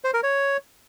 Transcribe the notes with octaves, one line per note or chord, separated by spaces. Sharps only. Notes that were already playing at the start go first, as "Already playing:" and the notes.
C5
A#4
C#5